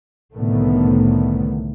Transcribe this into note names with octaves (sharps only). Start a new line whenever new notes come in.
C2 A2 D3 D#3 A3 B3